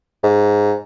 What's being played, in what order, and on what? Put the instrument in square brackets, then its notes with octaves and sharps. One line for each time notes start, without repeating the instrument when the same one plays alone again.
[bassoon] G#2